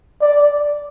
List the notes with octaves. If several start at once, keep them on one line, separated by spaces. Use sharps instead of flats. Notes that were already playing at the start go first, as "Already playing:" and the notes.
D5